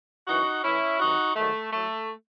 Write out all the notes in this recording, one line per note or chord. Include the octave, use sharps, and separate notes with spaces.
F#2 E3 D#4 F#4
A2 E3 C#4 E4
C3 D#3 F#3 D#4 F#4
G#2 D#3 F#3 A3
A2 F#3 A3